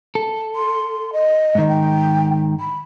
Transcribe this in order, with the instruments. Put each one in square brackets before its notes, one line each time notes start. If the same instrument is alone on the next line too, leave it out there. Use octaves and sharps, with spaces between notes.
[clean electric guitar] A4
[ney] C6
D#5
[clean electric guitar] G#2 D#3
[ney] G5
B5